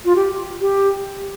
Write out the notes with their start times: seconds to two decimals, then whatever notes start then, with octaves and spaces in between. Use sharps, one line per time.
0.05 F4
0.16 G4
0.61 G4